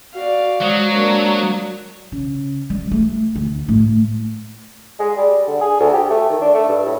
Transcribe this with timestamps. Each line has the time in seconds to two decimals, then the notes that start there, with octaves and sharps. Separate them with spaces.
0.15 F#4 D5 F5
0.61 F#3 G#3 C5 D#6
0.93 A#3 D4
2.12 C#3
2.70 G3
2.91 A3
3.36 D2
3.68 A2 A3
4.99 G#3
5.17 G3
5.47 D3
5.61 G#4
5.80 D2
5.94 G4
6.10 A3
6.30 D#3
6.42 D4
6.55 A3
6.69 G2
6.86 A2